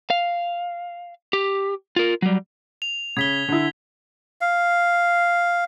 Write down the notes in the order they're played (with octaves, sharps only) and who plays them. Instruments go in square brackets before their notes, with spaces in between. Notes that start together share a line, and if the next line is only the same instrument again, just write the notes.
[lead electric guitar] F5
G4
F4 A#4
F#3 G3
[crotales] F7
[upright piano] C#3 [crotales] G#6 B6 G7
[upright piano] D3 E4
[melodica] F5